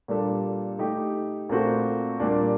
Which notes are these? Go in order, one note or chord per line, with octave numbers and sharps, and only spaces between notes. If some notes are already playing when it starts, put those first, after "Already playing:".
A#2 G3 D4 A4
A3 D#4 G4
A#2 A3 C4 F#4 A4
A#2 G3 A#3 D4